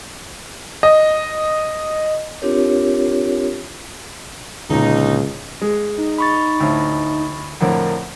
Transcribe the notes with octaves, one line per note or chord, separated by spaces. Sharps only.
D#5
C4 D4 F4 G4 A#4 C#5
C#2 A#2 D3 D#4
G#3
D#4
B5 C#6 A6
D2 A2
F2 A2 D3 A#4